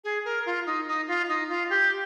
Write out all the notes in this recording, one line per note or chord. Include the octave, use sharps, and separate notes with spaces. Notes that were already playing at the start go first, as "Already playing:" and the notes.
G#4
A#4
F4
D#4
D#4
F4
D#4
F4
G4